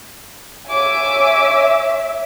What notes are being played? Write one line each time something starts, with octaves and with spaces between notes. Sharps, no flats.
C#5 E5 G#5 D6